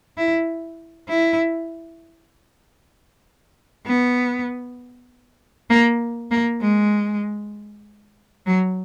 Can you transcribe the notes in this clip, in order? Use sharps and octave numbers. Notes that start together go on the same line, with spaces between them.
E4
E4
B3
A#3
A#3
G#3
F#3